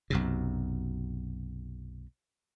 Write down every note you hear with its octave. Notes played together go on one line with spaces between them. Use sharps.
B1 F#2 C3